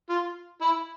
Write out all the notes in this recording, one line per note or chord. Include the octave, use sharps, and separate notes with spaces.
F4
E4